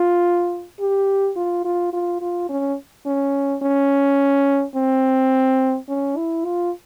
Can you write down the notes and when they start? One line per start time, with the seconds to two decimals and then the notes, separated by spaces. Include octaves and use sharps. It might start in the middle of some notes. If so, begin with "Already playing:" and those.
Already playing: F4
0.80 G4
1.36 F4
1.65 F4
1.93 F4
2.21 F4
2.50 C#4
3.06 C#4
3.63 C#4
4.76 C4
5.89 C#4
6.17 E4
6.45 F4